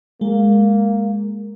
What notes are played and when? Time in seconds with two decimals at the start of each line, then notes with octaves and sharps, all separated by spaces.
0.21 G#3 A#3